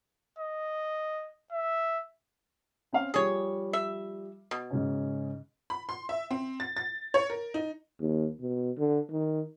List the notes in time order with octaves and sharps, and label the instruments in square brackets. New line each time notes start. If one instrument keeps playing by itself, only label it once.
[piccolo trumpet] D#5
E5
[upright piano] C4 C#4 F5
[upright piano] F3 G3 [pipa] G#4 C#5
[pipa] E5
B2
[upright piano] G#2 C#3 C#4
[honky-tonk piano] B5
C6
E5
C4
A6
A6
C#5
A#4
D#4
[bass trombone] D#2
B2
D3
D#3